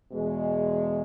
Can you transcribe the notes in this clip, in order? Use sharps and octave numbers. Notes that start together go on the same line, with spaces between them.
E2 B2 G#3